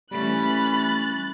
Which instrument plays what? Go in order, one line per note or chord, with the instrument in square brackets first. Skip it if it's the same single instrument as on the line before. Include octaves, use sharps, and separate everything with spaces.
[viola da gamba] E3 C#4 [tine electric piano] G3 A3 [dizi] B5 [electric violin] F#6 A6